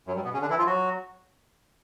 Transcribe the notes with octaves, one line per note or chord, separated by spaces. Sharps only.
F#2 F#3
G2 G3
B2 B3
C#3 C#4
D3 D4
E3 E4
F3 F4
F#3 F#4